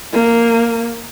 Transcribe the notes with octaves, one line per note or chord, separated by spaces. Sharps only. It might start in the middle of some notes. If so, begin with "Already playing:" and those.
A#3